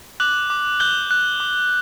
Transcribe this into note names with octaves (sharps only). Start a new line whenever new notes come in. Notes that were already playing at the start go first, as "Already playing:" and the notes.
D6 F#6 F#7
D6
F#6 G6 G7
F#6
D6